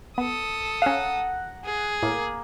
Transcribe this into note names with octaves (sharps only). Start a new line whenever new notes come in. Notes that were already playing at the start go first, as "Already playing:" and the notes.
B3 A4 D#6
C#4 F5 F#5 A#5
G#4
A2 A#3